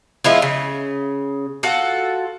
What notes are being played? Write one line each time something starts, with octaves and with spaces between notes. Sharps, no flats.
F3 G#3 E4 F4
C#3
F4 F#4 A4 F#5